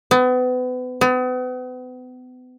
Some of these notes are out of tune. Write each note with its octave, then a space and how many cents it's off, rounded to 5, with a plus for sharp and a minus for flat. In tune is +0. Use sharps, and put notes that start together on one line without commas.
B3 +35
B3 +40